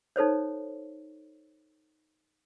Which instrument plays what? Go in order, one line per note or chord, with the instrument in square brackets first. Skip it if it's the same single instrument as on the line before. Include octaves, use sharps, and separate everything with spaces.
[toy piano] D#4 A4 C5 C#5